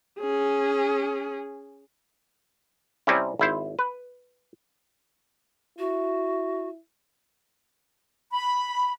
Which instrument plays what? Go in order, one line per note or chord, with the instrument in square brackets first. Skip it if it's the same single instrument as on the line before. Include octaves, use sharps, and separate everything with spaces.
[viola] C#4 G#4
[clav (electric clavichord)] C3 G3 C4 C#4 E4
G#1 E4 C5
B4
[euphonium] E4 [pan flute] F#4
[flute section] B5